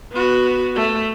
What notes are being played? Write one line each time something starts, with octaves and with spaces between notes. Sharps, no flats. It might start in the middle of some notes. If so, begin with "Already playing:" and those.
B3 F#4
A3